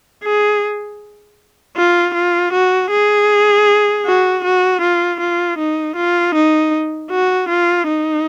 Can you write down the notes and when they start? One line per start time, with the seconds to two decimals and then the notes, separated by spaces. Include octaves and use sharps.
0.24 G#4
1.77 F4
2.15 F4
2.53 F#4
2.91 G#4
4.06 F#4
4.44 F#4
4.81 F4
5.20 F4
5.58 D#4
5.96 F4
6.35 D#4
7.11 F#4
7.49 F4
7.88 D#4